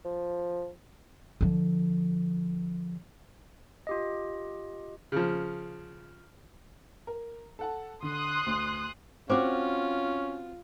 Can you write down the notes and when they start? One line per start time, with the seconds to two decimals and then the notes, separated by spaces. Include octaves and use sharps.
0.05 F3
1.41 D3 F3
3.87 F4 G4 D#5
5.12 C#3 F3
7.07 A#4
7.59 A4 F#5 A5
8.02 D3 C6 D#6 F#6
8.46 D2
9.30 C4 C#4 F4 F#4 C5 D6